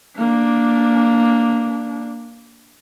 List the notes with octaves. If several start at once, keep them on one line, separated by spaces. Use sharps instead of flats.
A#3 D4